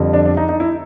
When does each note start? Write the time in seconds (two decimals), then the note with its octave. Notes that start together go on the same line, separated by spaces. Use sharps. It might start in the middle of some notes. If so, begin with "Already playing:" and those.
Already playing: F2 D3 G3
0.13 D4
0.25 D4
0.37 D#4
0.49 D#4
0.60 E4